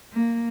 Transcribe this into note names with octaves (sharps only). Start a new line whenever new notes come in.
A#3